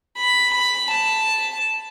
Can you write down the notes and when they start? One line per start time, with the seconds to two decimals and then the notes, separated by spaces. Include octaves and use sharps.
0.18 B5
0.54 B5
0.91 A5